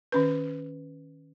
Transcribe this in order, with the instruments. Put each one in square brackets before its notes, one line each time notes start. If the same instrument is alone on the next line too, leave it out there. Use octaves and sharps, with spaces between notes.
[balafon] D#3 C#4 B4